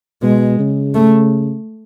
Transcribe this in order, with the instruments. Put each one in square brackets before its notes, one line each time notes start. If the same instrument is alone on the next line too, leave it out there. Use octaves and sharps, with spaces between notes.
[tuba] B2 [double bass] G#3
[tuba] C#3
[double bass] A3